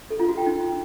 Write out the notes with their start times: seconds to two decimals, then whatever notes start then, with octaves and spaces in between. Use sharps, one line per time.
0.11 A4
0.19 F4
0.28 F#4
0.37 G5
0.46 D#4